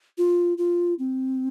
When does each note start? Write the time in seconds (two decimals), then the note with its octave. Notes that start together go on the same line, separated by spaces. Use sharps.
0.18 F4
0.58 F4
0.99 C4